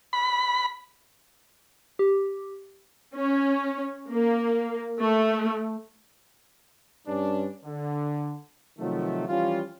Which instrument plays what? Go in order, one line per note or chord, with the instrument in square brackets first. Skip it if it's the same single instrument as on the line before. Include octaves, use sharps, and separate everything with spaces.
[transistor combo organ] B5
[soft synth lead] G4
[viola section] C#4
A#3
A3
[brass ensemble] G2 C#4 D4
D3
C3 D#3 F3 F#3 A3
E3 F3 G3 C#4 F4